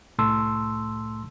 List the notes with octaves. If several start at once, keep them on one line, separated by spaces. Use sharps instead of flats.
C2 A2 A3 A5 C6 E6